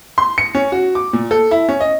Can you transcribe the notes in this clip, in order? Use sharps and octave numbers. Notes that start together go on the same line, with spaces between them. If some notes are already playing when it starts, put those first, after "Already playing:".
C6
C#7
C#4
F#4
D6
A#2
A4
E4
C#4
D#5